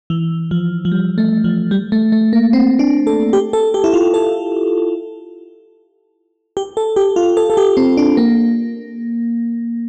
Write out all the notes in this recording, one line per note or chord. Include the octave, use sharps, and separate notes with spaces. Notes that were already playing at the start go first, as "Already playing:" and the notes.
E3
F3
F3
G3
A3
F3
G3
A3
A3
A#3
C4
D4
A4
G4
A4
G4
E4
F4
A4
G4
A4
G4
F4
A4
A4
G4
C4
D4
A#3